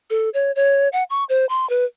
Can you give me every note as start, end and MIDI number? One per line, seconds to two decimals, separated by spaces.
0.10 0.29 69
0.34 0.52 73
0.56 0.89 73
0.93 1.03 78
1.10 1.24 85
1.29 1.46 72
1.49 1.68 84
1.70 1.85 71